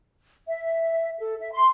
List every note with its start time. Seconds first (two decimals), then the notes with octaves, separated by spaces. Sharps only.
0.47 E5
1.19 A4
1.40 E5
1.53 C6